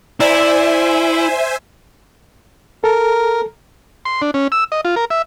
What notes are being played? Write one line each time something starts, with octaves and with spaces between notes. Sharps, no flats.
E4 C5 D5 E5 G#5 A#5 E6
A4 A#4
C6
D4
C#4
E6
D#5
F4
A#4
E5